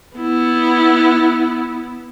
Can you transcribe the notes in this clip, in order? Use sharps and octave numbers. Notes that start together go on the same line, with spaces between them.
B3 E4